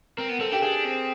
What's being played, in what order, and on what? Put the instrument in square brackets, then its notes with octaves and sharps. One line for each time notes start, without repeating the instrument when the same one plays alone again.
[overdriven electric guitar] C4 [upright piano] A#4
[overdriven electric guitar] B3
[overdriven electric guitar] C4 [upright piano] A4
[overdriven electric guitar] D4 [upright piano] G4
[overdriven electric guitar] D4 [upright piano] G#4
[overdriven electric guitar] C4